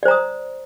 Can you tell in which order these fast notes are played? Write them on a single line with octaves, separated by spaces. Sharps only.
D5 C5 A#5 D#6